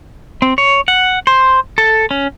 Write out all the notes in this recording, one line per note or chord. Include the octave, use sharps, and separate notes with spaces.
C4
C#5
F#5
C5
A4
C#4